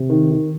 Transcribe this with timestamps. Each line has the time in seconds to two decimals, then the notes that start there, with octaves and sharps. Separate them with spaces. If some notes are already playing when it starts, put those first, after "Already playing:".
Already playing: C3
0.10 D#3
0.31 D#3